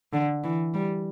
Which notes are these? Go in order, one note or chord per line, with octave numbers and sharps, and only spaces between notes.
D3
E3
G3